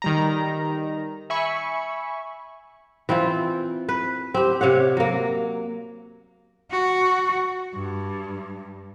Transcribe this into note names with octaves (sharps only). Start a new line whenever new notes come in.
D#3 G3 A#5
E5 G#5 B5 C#6
E3 C4 E4 F4
B4
C4 G4
C3 C#5 F5 F#5
F#3 A#3
F#4
G2